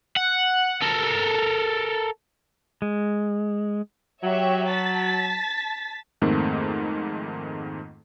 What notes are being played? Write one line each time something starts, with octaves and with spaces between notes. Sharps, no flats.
F#5
A4 A#4
G#3
F#3 G4 C#5 E5
A5 A6 B6
F2 G#2 D#3 A3 A#3 C4